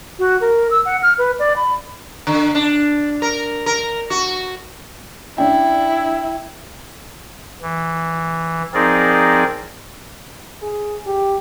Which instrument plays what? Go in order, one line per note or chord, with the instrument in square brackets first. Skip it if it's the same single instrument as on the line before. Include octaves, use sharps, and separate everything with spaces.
[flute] F#4
A#4
E6
F#5
F6
B4
D5
B5
[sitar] D3
D4
A#4
A#4
F#4
[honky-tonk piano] C#4 D4 [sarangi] E4 [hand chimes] G5
[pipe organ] E3
F3 C4 D#4 G#4 A#4 D5
[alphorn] G#4
G4